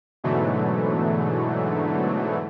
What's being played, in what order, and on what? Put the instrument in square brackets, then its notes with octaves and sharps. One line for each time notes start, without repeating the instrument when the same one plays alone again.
[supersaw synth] G#2 B2 D3 E3 F#3 A3